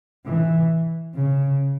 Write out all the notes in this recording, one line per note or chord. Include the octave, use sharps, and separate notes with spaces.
E3
C#3